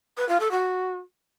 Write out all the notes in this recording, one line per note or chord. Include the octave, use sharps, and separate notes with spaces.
B4
F4
A4
F#4